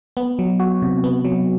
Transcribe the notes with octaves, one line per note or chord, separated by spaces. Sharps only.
B3
F#3
F#4
C3
B3
F#3